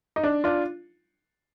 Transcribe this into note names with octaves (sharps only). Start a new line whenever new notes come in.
D#4
D4
D4 F4